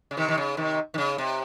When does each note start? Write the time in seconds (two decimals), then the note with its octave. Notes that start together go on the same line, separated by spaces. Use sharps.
0.11 C#3
0.17 C3 D#3
0.28 D#3
0.38 C#3
0.57 C3 D#3
0.94 D#3
0.98 C#3
1.18 C3